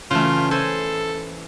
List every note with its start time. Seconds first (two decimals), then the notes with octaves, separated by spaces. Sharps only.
0.11 C#3 E3 A3 F4
0.51 A4 C5 G#5